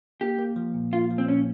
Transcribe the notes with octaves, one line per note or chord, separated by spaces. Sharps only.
A#3 G4
A#3
F3
A#2
A#3 F4
F3
C4
A#2 C#4